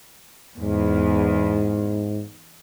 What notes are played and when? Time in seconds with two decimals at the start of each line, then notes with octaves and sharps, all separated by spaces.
0.60 E2 G#2